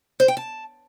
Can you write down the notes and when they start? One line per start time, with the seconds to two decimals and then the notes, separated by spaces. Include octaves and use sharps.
0.20 C5
0.28 G5
0.37 A5